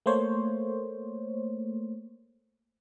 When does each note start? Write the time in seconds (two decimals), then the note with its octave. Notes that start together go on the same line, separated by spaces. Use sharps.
0.06 A3 A#3 C5 C#5